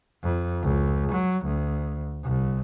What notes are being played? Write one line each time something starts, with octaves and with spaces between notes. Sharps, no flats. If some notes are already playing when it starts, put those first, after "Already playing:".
F2
C#2
F#3
D2
C2